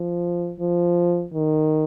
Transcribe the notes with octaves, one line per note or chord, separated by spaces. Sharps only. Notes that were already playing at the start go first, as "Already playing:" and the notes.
Already playing: F3
F3
D#3